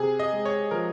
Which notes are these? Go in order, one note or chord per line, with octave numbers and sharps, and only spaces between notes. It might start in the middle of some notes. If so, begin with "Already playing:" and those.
Already playing: C3 G#4
D#5
G#3
C#5
F3 A#4